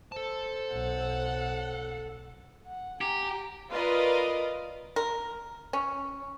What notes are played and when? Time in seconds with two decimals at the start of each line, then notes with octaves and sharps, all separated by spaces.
0.12 A4 C5 A5
0.72 B1 F#5
2.66 F#5
3.01 G4 G#5 A#5
3.72 F4 A#4 B4 D5 D#5 F5
4.96 A#4
5.73 C#4